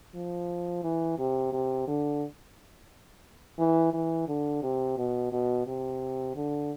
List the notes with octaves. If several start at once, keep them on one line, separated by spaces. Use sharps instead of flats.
F3
E3
C3
C3
D3
E3
E3
D3
C3
B2
B2
C3
D3